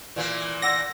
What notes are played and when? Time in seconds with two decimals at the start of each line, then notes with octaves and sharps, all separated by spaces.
0.16 A#2 E3 A#3
0.62 D5 F#5 E6 A#6